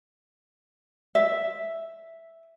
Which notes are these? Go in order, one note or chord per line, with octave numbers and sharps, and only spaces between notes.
E5